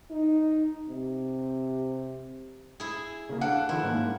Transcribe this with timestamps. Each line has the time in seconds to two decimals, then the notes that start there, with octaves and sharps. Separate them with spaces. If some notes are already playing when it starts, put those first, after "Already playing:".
0.11 D#4
0.89 C3
2.80 E4 G#4
3.29 C#3 A#3
3.41 D4 A4 F5 F#5
3.69 D#3 F3 E4 C5
3.83 G#2 A#3 C#4